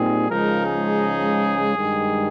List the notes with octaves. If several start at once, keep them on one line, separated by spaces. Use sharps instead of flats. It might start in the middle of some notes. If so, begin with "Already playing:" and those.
Already playing: A#2 G3 C4 D#4 G#4
C#2 C#3 F3 G#3 D#4 A#4
G#4
G2 D#3 G#3